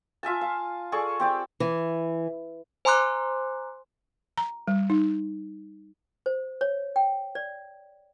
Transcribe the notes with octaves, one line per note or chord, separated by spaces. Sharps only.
F4 E5 G#5 A5
F5
G#4 A4 D5 C#6
C4 G4 D5
E3
C5 G#5 A#5 C6 D6 F#6
A#5
G3
D#4
C5
C#5
G5
D5